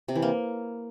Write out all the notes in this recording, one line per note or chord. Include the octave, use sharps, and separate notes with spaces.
C3
E3
A#3